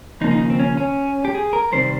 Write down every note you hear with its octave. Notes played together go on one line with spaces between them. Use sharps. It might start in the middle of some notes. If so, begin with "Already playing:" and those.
D#2 C#3 F3 A#3 D#4
D#4
C4
C#4
C#4
G4
G#4
A#4
C2 C3 D#3 G3 C5